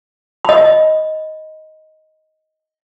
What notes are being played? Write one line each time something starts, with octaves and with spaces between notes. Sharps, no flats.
D#5 B5